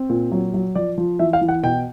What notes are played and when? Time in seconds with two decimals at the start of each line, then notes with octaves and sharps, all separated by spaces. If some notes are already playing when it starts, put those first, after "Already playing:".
Already playing: C4
0.10 A#2
0.32 F#3
0.54 F#3
0.75 F3 D5
0.98 F3
1.19 E3 E5
1.33 F5
1.41 E3
1.48 F#5
1.63 B2 G5